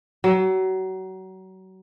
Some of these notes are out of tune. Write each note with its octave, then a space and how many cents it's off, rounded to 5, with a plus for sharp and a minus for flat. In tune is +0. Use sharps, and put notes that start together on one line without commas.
F#3 +30